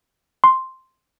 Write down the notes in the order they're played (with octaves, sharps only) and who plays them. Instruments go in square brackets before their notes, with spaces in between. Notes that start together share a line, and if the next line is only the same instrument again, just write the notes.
[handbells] C6